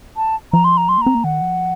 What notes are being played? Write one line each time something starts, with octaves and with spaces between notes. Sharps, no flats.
A5
F3 A#5
C6
A#5
F#3 C6
A#3
C4 A#5
A#3
D#3 F#5
F3